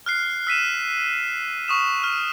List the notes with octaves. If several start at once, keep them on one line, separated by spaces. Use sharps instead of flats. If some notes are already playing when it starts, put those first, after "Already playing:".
F6 F#6 C7
E6 B6 D#7 E7
C#6 D#6 E7
F6